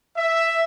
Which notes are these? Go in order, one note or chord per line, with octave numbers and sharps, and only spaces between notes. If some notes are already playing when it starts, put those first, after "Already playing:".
E5